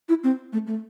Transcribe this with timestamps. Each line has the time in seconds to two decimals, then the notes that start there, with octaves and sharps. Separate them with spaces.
0.09 E4
0.23 C4
0.53 A3
0.67 A3